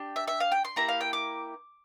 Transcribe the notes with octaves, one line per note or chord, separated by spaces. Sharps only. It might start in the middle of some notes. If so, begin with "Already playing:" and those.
Already playing: D4 G4
E5
E5
F5
G5
C6
A#3 E4 G4 A#5
F5
G5
D6